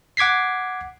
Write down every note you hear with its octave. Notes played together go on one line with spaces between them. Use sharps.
F#5 D6 G#6 B6 C7